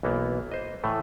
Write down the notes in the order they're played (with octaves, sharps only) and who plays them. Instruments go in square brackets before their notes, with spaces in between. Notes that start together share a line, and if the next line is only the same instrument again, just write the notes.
[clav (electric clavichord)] B1 E3 A#3 B3
C5 D#5
A2 E3 A3